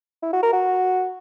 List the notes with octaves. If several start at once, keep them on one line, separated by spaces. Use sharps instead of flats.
E4
F#4
A#4
F#4